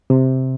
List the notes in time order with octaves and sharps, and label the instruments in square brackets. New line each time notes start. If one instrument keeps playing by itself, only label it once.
[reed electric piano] C3